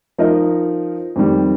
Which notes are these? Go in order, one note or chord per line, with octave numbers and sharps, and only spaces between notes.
F3 D#4 A#4 D#5
F2 D#3 G3